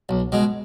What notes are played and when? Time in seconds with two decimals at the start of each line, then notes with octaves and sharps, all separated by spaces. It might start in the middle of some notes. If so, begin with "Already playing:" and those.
0.09 B1
0.32 B2 G#3